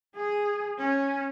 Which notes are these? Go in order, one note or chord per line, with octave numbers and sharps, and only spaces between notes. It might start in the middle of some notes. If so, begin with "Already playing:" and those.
G#4
C#4